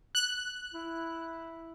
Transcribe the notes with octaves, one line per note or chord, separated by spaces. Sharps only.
F#6
E4